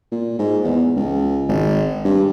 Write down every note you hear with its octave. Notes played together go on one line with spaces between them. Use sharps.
A#2
G#2
E2
C#2
G#1
G2